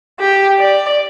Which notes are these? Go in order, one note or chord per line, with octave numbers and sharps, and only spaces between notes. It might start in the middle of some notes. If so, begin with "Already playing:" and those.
G4
D5